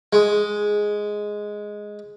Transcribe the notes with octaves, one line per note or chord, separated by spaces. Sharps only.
G#3